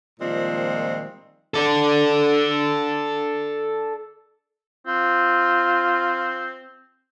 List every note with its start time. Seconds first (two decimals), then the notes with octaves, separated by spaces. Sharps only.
0.20 A#2 D#3 F3 G3 G#3 C4
1.54 A4 D5
4.87 C4 F4